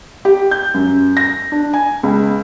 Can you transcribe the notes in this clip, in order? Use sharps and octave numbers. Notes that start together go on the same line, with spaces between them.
G4
G6
F#2
A#6
D4
G#5
C#2